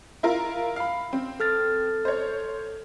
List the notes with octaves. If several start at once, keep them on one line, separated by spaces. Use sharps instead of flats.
E4 F4 A#4
F5 B5
C4
A4 F6 A6
C5 C#5